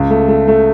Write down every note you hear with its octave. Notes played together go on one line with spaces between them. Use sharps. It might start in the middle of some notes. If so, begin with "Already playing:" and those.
Already playing: C#2
A3
A3
A3